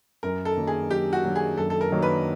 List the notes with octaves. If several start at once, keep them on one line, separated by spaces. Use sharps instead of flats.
F#2 A#4
A4
D#3 F#3 A#3 D4
G#4
F#2 G4
F#4
D#3 F#3 A#3 D4
G#4
F#2 A4
A4
A#4
D#3 F#3 A#3 D4
B4